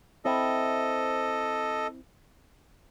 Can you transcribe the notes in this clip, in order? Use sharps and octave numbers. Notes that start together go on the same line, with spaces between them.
C4 E4 A4 D#5